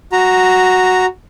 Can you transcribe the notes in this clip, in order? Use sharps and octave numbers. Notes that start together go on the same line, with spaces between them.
F#4 A#5